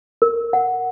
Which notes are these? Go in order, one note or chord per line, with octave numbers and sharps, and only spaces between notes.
A#4
F#5